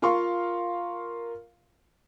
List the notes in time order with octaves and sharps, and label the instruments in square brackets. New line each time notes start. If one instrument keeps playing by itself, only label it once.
[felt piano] F4 A#4 F5 C6 C#6